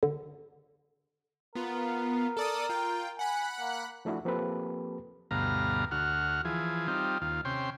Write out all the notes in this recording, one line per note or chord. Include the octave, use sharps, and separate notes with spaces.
D3
B3 F4 A#4
A4 D5 D#6
F4 G5
F#5 G#5 B5 F#6
A#3
F3 A3 D4 E4 F#4
F3 A#3 C4 G4 A4 B4
D2 G2 B2 F5 A#5
D2 F#4 F6
E3 F3 G#4
G3 C4 D#4 F4
D#2 F4
C3 C#4 G5 C6